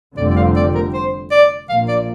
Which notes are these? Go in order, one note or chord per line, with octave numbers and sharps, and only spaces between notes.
F1 F2 D3 G3 C4 D5
D5
F5
D5
A#4
C5
D5
A#1 A#2 A#3 F5
D5